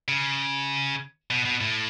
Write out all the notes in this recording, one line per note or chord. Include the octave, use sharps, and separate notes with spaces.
C#3
B2
B2
A2